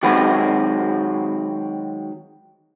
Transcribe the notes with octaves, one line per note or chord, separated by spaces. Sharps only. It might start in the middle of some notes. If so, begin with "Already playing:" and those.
D#3 F#3 G#3 C4 F#4 B4